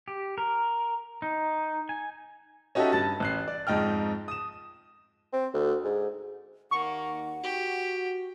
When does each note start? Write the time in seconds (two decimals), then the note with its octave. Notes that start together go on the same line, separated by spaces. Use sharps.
0.08 G4
0.38 A#4
1.22 D#4
1.89 G#5
2.75 C#4 D#4 F#4 G4 A4 E5
2.92 G2 A5 A6
3.20 A1 F#6 C7
3.48 D5
3.67 F2 G#2 D#4 G5 F6
4.28 D#6 E7
5.33 C4
5.54 D2
5.84 G#2
6.71 D#2 A#3 D#4 F#5 C#6
7.44 F#4 G4